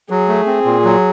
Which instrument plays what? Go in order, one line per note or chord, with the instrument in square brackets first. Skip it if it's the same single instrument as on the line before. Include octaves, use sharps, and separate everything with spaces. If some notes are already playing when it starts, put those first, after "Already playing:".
[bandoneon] F#3 [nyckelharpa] G#4
[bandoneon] A3
C4
A#2
F#3